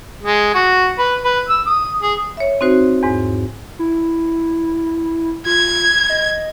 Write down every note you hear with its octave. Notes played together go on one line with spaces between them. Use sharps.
G#3
F#4
B4
B4
E6
D#6
G#4
C#5 E5
C4 D#4 F#4 C5
E2 G#2
E4
F4 G#6
D#5